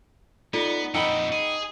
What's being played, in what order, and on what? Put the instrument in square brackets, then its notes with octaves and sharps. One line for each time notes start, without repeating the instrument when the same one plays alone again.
[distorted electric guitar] B3 [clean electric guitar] D#4 [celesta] F4 A4 D5
[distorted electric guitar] F2 A#2 [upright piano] D#4 [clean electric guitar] F#5 G5 B5 [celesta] E6
[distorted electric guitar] G#4